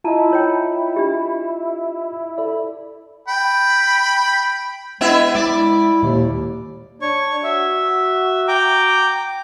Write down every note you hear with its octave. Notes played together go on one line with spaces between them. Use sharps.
E4 F4 D#5 A5 A#5
D#4 C#5 G5
D4 G4
A4 D5
G5 B5
G#3 B3 E4 E5
G#3 E4 D5
D#2 A#2 D#3
D4 C#5 C#6
F#4 E5
G5 A#5 D6